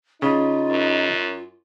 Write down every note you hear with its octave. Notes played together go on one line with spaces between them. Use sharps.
C#3 D#4 F4
F#2